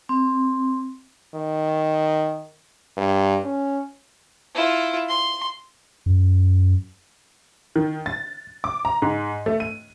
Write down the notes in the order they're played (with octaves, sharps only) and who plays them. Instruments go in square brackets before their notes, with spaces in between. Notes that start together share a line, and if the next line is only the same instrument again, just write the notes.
[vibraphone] C4
[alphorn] D#3
G2
C#4
[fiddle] E4 F4
C6
[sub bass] F#2
[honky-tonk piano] D#3
A6
D6
A#5
G#2
A3
D#7